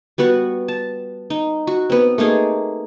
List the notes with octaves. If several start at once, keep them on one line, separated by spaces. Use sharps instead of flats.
G3 B3 F#4 F#5
A5
D#4
F#4
B3 C4
A3 A#3 D#4 G#4